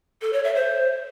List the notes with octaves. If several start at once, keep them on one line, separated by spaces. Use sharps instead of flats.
A4
C#5
E5
C5